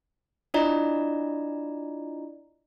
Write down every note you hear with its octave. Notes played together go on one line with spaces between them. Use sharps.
D4 E4 F4 D5 D#5 A#5